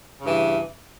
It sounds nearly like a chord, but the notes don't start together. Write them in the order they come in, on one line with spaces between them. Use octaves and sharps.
C#3 G2 E3